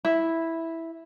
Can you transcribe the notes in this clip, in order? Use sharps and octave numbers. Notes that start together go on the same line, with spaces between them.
E4